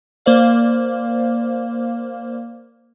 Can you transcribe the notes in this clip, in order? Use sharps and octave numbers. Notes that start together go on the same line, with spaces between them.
A#3 C5 D5 F5